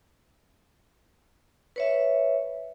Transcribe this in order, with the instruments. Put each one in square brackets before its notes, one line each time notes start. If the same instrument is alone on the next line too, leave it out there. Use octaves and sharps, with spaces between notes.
[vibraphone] B4 C#5 E5